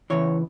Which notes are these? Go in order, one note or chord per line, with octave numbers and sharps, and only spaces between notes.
E2 C#3 E3 C#5